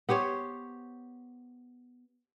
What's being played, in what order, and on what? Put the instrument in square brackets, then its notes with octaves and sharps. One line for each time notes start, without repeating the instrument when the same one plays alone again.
[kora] B3 G4 C5 C#5